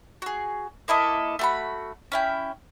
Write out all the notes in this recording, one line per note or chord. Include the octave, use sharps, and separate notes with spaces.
F#4 G#4
A#3 E4 A4 D#5
A3 F#4 B5
C#4 E4 G5